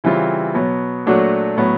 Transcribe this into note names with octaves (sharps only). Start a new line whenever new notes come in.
C#3 E3 G3 C4 F4
B2 F#3 B3
A#2 F#3 A3 D4 F#4
A2 F#3 B3